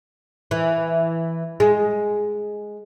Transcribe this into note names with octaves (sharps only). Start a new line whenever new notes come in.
E3
G#3